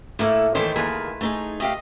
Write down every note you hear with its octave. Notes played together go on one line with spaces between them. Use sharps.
A2 A3 A#3 E4 A4
D#3 E3 A3 A4 C5 C#5
D#2 E4 F4 G#4 A#4 B4
A3 D#4 G#4
A3 G4 D#5 F5